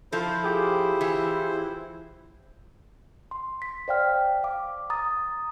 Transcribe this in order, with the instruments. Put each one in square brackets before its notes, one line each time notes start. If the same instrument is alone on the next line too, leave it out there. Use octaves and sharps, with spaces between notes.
[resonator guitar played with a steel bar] F3 A4 [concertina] E4 C5
[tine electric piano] F4 G4 G#4
[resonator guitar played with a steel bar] E3
[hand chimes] C6
B6
C5 D5 F5 G5 F6
F5 D6
A#5 D#6 A6